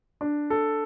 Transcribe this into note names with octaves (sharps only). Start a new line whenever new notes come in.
D4
A4